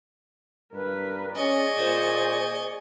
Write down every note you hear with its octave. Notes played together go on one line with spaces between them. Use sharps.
G2 A#4 B4
C#4 G#4 D5 D#5 C#6
A#2 C5